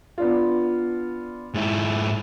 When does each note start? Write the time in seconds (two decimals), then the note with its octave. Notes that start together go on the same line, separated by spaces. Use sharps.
0.18 B3 D4 F4
1.54 G#2 E4